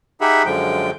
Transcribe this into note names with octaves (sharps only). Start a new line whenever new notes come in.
D#4 G4 G#4 E5 F#5 B5
F#2 D3 F3 G#3 G5